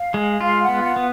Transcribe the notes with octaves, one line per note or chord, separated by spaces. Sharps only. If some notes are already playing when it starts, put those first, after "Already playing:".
Already playing: F5
G#3
F4 F5
F#5
B3
F#5
B3